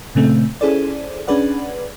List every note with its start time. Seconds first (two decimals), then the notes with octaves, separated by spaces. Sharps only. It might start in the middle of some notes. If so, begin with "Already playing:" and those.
0.15 A#2 C#3 A3 C4
0.61 C#4 E4 G#4 A4 C5 D5
1.27 C#4 D4 G#4 B4 D5 F#5